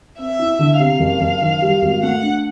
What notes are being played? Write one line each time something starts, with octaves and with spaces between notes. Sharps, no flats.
C4 E5
E4
D3
C3 F5
F#1
F#1
D#3
G3
G#1
A3 F#5
D4